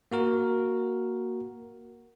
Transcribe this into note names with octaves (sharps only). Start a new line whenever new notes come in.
A#3 F#4 A#4